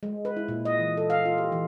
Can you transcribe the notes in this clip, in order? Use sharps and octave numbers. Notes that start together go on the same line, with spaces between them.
G#3
B4
E4
A#2
D#5
E3
A4
F5
F4
G4
E3